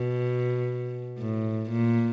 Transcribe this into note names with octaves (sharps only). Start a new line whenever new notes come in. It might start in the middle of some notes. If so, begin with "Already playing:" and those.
Already playing: B2
A2
A#2